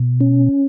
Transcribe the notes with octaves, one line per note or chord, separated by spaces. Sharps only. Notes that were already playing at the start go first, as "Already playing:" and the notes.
Already playing: B2
C#4